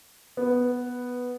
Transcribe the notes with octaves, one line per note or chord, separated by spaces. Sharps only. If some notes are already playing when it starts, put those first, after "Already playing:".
B3